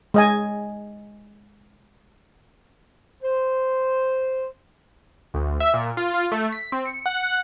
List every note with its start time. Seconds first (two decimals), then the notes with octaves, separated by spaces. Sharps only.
0.14 G#3 D#5 G#5
3.22 C5
5.34 D2
5.60 E5
5.74 A#2
5.97 F4
6.14 F4
6.32 A3
6.52 B6
6.72 C4
6.86 C#7
7.06 F#5